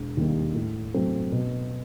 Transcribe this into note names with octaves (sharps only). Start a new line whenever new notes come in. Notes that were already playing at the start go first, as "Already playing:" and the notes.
Already playing: E1
D#2 D#3 G3 A#3
A2
F#3 A3 C4
B2